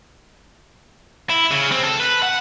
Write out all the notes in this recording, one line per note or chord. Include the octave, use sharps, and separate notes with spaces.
E4
C#3
C4
A4
B4
F#5